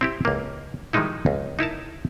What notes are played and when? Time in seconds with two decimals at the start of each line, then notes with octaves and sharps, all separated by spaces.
0.01 C4 E4 G4
0.25 C#2 A#3
0.93 D#3 F3 G3 G#3 D#4 E4
1.26 C#2
1.59 D#4 E4 A#4 A5